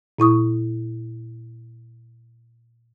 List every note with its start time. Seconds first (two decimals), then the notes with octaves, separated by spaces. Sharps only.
0.19 A#2 E4 C#6 D#6